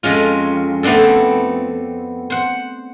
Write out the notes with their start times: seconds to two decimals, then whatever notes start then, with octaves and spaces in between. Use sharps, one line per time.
0.03 F2 G#3 C#4 F4
0.83 A3 B3 C4 D4 A4
2.30 C5 F#5